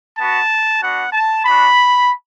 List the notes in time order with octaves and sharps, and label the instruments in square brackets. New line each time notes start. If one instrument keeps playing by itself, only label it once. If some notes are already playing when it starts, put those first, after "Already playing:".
[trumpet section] B3 F#4 A5
B3 D4 F#4 F#5
A5
B3 D4 F#4 B5